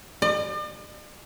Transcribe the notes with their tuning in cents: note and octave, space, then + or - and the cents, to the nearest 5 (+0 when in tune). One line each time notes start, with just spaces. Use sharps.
D5 +45